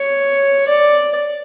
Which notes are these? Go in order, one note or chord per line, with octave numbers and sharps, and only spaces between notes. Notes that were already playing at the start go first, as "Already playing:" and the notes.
Already playing: C#5
D5